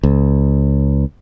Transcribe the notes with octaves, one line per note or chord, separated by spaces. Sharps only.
C#2